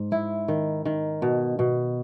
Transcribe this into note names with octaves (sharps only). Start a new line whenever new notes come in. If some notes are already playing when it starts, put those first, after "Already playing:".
Already playing: G#2
E4
D#3
D#3
B2
B2